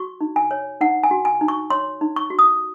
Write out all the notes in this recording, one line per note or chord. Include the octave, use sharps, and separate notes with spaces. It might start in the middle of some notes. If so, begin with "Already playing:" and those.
Already playing: F#4 C#6
D#4
G#5
C#5
D#4 F#5
G#5
F#4
G#5
D#4
C#6
C#5 C6
D#4
C#6
F#4
D#6